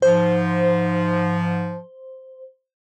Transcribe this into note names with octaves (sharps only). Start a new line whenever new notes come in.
G#2 F3 C5